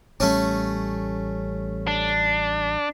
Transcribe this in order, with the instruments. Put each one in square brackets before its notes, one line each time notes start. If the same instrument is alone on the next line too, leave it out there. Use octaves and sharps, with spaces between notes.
[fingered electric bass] A1 G3 [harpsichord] A3 C#4
[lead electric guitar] D4